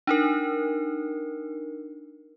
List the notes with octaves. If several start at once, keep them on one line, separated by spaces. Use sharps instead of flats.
D4 D#4 A#4